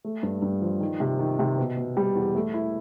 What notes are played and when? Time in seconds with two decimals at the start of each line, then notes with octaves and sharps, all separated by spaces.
0.04 A3
0.23 G2
0.42 G2
0.62 F3
0.80 D#3
1.00 C3
1.19 D#3
1.39 C3
1.58 B2
1.77 B2
1.97 G3
2.16 E2
2.35 A3
2.54 E4